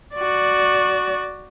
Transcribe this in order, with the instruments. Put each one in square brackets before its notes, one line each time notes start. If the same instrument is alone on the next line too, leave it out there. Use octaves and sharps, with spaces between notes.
[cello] F#4 D5